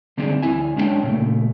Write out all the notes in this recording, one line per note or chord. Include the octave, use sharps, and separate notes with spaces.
D3 G3 C4 D4 D#4 G#4
D2 E4 G#5
G#3 C#4 D4 E4 C#5 G5
A#2 C#3 A3